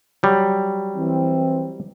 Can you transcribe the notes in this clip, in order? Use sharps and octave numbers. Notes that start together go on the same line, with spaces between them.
F#3 G3
E3 C4